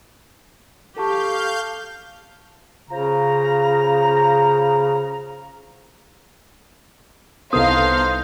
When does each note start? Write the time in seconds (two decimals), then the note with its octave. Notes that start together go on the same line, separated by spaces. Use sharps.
0.97 G4 A4 F5 A5 C#6 G6
2.90 C#3 F4 C5 A#5
7.53 C2 B3 D#4 E4 A4 C5 F5 D#6